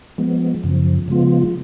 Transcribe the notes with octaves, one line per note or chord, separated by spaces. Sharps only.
F3 G#3 B3
F#2 C#3 F3
C#3 F3 G#3 B3 F4